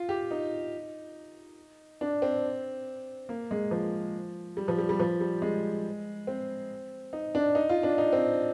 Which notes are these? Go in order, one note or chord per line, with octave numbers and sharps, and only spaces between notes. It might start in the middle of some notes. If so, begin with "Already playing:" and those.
Already playing: F4
G4
D#4
D4
C4
A#3
G#3
F3
G3
F3
G3
G3
F3
G3
G#3
C4
D#4
D4
D#4
F4
D4
D#4
C4